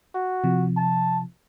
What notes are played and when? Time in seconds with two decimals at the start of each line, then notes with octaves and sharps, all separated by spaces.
0.15 F#4
0.44 C3 F3
0.77 A5